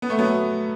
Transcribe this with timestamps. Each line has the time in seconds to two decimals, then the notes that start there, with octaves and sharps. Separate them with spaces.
0.02 B3
0.10 A3
0.18 F#3 B3